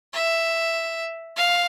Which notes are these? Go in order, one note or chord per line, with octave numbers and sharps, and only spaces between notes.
E5
F5